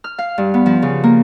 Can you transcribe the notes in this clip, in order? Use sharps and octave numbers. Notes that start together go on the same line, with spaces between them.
F6
F5
G2
B3
F3
C#3
A#3